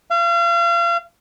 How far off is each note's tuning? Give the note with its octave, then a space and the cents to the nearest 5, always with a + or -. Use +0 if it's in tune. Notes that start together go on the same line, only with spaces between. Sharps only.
F5 -35